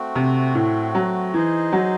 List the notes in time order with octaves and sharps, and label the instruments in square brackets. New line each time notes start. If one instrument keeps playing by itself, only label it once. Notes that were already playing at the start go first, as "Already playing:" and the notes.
Already playing: [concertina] A3 C4 F#4
[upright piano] C3
A2
F#3
[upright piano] E3 [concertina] D#4 G#4 C5 D#5
[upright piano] F#3